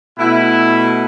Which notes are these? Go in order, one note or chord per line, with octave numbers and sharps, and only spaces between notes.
B2 A3 E4